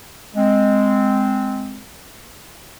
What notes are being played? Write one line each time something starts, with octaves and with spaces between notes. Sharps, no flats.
G#3 C4